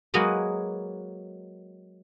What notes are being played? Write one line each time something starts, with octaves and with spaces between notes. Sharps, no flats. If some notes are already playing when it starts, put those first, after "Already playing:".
F#3 G#3 A#3 F#4 G#4 B4